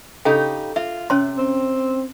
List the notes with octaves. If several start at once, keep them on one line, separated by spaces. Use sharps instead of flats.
C#3 D#4 G4 A4 G5
F4 E5
C3 C#4 C#5 C6
C4